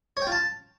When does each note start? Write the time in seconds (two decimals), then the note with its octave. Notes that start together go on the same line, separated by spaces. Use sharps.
0.17 C#5
0.22 G5
0.27 F4
0.32 A5